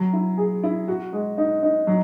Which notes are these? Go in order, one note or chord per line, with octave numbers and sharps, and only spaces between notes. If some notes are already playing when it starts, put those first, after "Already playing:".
Already playing: F#3
E4
G#4
E4
F#4
G#3
D#4
D#4
F#3